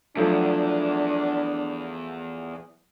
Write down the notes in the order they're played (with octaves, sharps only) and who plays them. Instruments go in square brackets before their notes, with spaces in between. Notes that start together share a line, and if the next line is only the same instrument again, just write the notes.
[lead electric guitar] E2 [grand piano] F3 F#3 A3 [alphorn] D4